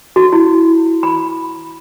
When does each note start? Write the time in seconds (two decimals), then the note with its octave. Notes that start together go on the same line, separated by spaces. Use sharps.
0.16 F#4
0.32 E4
1.03 B5